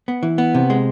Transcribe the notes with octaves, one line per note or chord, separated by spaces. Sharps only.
B3
E3
B3
C3
G#3